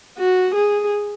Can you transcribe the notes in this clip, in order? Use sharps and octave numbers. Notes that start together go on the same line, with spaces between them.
F#4
G#4